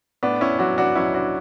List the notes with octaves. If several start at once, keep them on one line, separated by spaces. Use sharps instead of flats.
A2 B3 D4
C#4 E4
F#3 D4 F#4
D4 F#4
B1 C#4 E4
D4 F#4